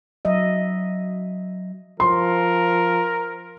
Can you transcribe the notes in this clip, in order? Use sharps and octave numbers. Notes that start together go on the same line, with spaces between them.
F#3 D#5 E5
F3 A#4 C6